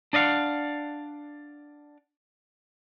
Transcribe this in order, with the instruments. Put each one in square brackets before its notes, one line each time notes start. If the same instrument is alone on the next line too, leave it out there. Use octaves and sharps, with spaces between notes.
[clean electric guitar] D4 D5 D#5 F5 F#5